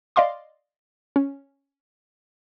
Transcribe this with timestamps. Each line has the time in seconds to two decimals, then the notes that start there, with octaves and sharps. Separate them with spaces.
0.16 D5 D#5 F5 C6 D6
1.16 C#4